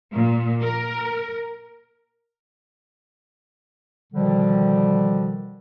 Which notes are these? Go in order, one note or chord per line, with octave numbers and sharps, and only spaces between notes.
A#2
A#4
B2 D3 D#3 F3 G3